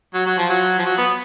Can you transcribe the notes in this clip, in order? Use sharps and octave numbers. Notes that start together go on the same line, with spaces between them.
F#3
F#3
F3
F#3
F3
F#3
B3